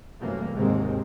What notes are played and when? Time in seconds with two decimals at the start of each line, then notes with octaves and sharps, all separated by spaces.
0.19 F#2 C3 E3 G3 A3 A#3
0.53 D#2 G#2 C3 G#3 C4